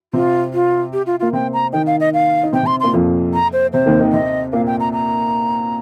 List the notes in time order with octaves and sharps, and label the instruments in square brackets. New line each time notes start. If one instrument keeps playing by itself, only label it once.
[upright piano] C3 C4 [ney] F4
[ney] F4
G4
F4
[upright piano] A#3 [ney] F4
[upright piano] C3 C4 [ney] G5
[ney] A#5
[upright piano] D#3 D#4 [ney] G5
[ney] F5
D#5
F5
[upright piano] D#4
[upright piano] C3 C4 [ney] G5
[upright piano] C3 C4
[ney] C6
[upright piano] A#2 A#3 [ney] C6
[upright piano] F2 F3
[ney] A#5
C5
[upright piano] C3 [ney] C5
[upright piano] D#2 D#3
D#3 D#4
[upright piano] C3 C4 [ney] D#5
[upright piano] A#2 A#3 [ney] F5
[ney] G5
A#5
A#5